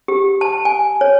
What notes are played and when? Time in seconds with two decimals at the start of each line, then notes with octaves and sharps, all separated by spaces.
0.08 G4
0.41 A5
0.65 G#5
1.01 C#5